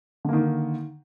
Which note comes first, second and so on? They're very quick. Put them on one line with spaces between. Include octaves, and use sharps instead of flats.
D3 A#3 D#3